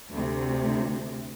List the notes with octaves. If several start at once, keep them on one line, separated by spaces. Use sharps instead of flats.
D2 C3